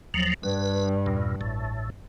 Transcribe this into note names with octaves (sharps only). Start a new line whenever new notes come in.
D#2 F3 F#3
G2 B4
E2 A#2
A1 A2